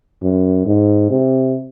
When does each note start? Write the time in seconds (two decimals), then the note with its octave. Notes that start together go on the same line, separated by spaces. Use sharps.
0.22 F#2
0.66 G#2
1.10 C3